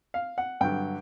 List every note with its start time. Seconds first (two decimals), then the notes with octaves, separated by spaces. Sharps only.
0.14 F5
0.38 F#5
0.61 G2 D3 F#3 G5